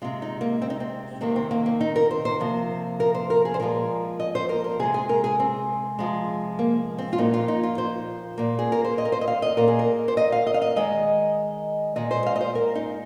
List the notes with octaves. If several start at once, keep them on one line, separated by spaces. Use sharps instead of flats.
C3 G#3 F4
D#4
A#3
C4
D#4
C4
C3 D#3 A#3 C4
C4
A#3
A#3
D#4
A#4
C5
C5
C3 F3 A#3
A#4
C5
A#4
G#4
C5
A#2 F3 G#3 A#4
D#5
C5
A#4
A#4
C3 G#3 G#4
G#4
A#4
G#4
C4
C3 F3 G#3
A#3
C4
F4
A#2 F3 A#3 D#4
F4
D#4
F4
C5
A#2 A#3
G#4
A#4
C5
D#5
A#4
C5
D#5
F5
D#5
A#2 A#3 A#4
G#4
A#4
C5
D#5
F5
D#5
F5
D#5
D#3 G#3 D#5
A#2 G#3 D#5
C5
F5
D#5
C5
A#4
D#4